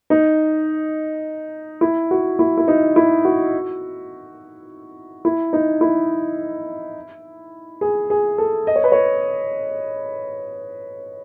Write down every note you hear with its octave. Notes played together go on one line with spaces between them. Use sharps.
D#4
E4
F#4
E4
E4
D#4
E4
F#4
E4
D#4
E4
G#4
G#4
A4
D#5
C#5
B4
C#5